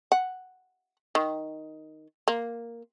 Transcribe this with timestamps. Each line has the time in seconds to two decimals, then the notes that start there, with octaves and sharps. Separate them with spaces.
0.12 F#5
1.15 D#3
2.28 A#3